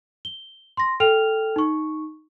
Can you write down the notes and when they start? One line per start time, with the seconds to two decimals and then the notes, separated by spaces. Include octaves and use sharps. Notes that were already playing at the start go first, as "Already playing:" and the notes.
0.25 G7
0.77 C6 A#6
1.00 A4 G5 F6 F7
1.56 D#4 C#6